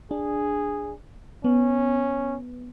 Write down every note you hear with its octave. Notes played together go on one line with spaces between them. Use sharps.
D4 G#4
B3 C#4